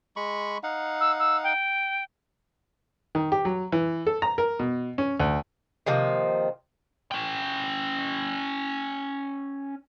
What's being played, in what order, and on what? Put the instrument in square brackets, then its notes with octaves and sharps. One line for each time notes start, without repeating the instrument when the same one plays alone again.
[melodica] G#3 B5 C#6
D#4 F5 F#5
[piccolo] E6
E6
G5
[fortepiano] D#3
G4
F#3
E3
A4
A#5
A#4
B2
C#4
D2
[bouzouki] C3 D#3 F3 A#3
[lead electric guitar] C#4 G5